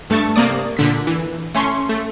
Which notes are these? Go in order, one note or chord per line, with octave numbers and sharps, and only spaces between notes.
G2 A3 A5 C#6 A6
C3 A#3 D5 D#6
A#2 D3 B6
E3
A3 C#4 C6 C#6
A3